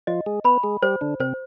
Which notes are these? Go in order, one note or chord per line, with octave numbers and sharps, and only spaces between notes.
F3 F4 D#5
G#3 G#4
B3 B4 B5
G#3 G#4
G3 G4 C5
D3 D4
C3 C4 C5